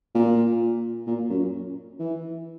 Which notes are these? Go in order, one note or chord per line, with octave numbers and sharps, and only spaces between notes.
A#2
A#2
F#2
E3